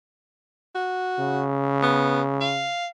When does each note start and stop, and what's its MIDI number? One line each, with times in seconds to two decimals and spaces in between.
0.75 1.43 66
1.19 2.72 49
1.83 2.21 59
2.41 2.87 77